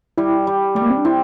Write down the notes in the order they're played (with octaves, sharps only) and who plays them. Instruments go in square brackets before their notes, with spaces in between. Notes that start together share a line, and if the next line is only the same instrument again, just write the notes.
[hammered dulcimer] G3 [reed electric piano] E4
[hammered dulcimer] G3
[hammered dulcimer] G3 [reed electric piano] A3
[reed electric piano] A#3
C4
D4
[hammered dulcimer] C4 [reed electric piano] E4